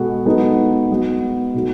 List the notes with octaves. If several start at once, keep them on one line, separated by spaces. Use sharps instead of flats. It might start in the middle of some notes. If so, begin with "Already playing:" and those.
Already playing: B2 G#3 B3 F#4 A4
G#3 B3 D#4 F#4 A4
G#3 B3 F#4 B4
B2 F#3 A3 D#4 F#4